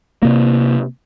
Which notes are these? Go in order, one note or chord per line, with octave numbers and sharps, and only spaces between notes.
C3 A#3